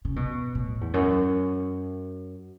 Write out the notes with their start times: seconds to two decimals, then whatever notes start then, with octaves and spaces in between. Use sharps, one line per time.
0.05 C#3
0.16 B2
0.55 A2
0.81 E2
0.94 F#2